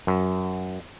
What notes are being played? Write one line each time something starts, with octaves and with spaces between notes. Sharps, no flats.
F#2